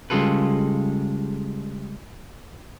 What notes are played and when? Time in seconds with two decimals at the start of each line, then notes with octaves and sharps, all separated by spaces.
0.10 C#3 G3 G#3 F4 A4 B4